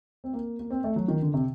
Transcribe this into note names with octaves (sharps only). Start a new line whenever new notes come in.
C4
A#3
A#3
C4
A3
F#3
D#3
D3
C3